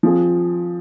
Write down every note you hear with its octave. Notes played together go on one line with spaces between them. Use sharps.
F3 C4 F4 G#4